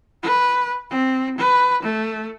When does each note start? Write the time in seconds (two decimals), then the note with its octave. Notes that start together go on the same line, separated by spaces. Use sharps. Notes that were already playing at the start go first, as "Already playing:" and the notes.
0.23 B4
0.90 C4
1.38 B4
1.83 A3